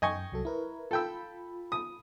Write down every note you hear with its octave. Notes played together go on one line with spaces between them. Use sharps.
F#2 D#5 G5 G#5 C#6
C2 F#3 A4
E4 A#4 B4
F4 A4 G5 B5 E6
D#6